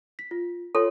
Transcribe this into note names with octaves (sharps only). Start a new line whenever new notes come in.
B6
F4
F4 A4 C#5 C6